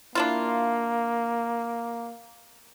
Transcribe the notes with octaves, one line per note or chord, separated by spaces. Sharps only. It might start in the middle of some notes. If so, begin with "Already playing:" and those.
A#3 D4 E4 F4